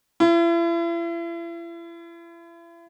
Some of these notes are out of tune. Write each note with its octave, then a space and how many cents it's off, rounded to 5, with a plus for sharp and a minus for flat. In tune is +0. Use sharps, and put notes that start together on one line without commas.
E4 +40